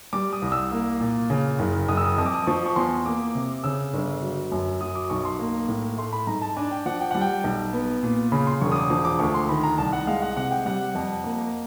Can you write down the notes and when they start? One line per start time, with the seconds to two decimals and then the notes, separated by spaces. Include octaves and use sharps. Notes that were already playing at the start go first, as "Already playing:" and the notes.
0.13 G3 D6
0.33 D#6
0.42 C2
0.52 E6
0.71 A#3
1.00 A#2
1.30 C#3
1.59 F#1
1.88 F#1 D#6
1.97 E6
2.06 D#6
2.18 F2 D#6
2.26 D6
2.34 D#6
2.47 F3 C#6
2.66 C#6
2.76 E2 C6
3.05 A#3 D6
3.35 C3
3.64 C#3 E6
3.93 G1
4.22 F#3
4.52 F#2
4.81 F#3 D#6
4.95 D6
5.10 B1 C#6
5.25 C6
5.39 A#3
5.69 A2
5.98 A3 C6
6.13 B5
6.27 G#2 A#5
6.42 A5
6.56 D4 G#5
6.71 G5
6.86 F3 F#5
7.01 G5
7.11 G3 F#5
7.21 G5
7.44 B1
7.73 B3
8.03 A#2
8.32 C#3 B5
8.47 C6
8.61 E1 C#6
8.72 D#6
8.76 D6
8.90 F3 D6
9.05 D6
9.19 D2 C#6
9.34 C6
9.49 D#3 B5
9.63 A#5
9.78 C2 A5
9.93 F#5
10.07 G#3 F5
10.22 F#5
10.37 C3 F#5
10.51 G5
10.66 G3 F#5
10.95 F2
11.24 A#3